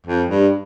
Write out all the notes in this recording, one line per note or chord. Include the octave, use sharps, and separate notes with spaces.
F2
G2